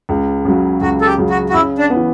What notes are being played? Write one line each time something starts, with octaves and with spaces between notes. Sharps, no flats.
C#2
C#3 F#3
C#2 F#4
A4
G4
C#3 F#3
F#4
F#4
C#3 E4
D4
E3 B3